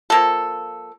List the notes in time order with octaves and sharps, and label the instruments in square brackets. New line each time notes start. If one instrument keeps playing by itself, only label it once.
[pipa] F3 A#3 A4